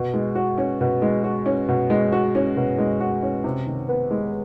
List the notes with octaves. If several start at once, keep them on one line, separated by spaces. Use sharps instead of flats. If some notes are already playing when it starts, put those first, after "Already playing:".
Already playing: B2
G#3
F#4
C#4
B2
G#3
F#4
C#4
B2
G#3
F#4
C#4
B2
G#3
F#4
C#4
C3
D#3
B3
G#3